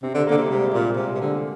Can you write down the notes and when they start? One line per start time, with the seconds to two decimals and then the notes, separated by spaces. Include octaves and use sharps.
0.03 C3 C4
0.14 D3
0.27 D3 A#3
0.38 C3
0.46 G3
0.50 C3 G#3
0.74 A#2
0.97 C3
1.15 C3
1.21 D3